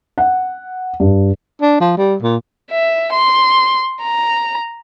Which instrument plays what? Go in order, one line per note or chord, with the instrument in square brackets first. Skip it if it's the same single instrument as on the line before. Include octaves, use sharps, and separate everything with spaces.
[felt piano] F#5
G2
[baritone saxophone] D4
F3
G3
A#2
[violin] E5
C6
A#5